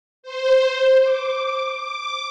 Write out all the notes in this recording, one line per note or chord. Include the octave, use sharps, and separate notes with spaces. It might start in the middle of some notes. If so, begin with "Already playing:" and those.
C5
D6
D6